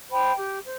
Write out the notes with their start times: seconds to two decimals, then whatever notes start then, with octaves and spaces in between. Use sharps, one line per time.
0.11 C5 G5 B5
0.36 G4
0.63 C5